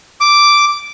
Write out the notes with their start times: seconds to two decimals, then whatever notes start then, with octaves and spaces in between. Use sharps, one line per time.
0.21 D6